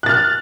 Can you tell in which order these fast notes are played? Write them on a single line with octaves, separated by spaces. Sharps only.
F#6 A6 F6